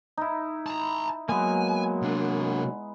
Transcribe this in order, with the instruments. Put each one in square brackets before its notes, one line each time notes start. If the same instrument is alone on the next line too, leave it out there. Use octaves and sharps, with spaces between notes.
[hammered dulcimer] D#4 E4
[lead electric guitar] A5 A#5
[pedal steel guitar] F#3 A#3 [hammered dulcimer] G#3 B3 [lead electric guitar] G#5
[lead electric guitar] C3 D4